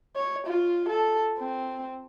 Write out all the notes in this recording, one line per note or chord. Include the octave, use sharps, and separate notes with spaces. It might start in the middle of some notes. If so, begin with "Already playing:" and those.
C#5
F4
A4
C4